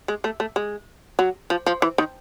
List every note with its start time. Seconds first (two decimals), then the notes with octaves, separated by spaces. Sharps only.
0.08 G#3
0.24 A3
0.40 A3
0.56 G#3
1.19 F#3
1.50 F3
1.66 F3
1.82 E3
1.98 D#3